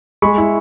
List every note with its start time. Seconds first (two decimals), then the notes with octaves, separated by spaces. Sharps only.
0.22 G#3 B5 C#6
0.38 E4